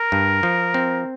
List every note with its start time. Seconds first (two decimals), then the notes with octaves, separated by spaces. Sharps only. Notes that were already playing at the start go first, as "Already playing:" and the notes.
Already playing: A#4
0.12 G2
0.43 F3
0.74 C4